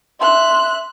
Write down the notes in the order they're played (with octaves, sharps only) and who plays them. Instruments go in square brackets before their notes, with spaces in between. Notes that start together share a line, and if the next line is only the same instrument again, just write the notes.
[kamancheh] E5 F#6 [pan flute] C6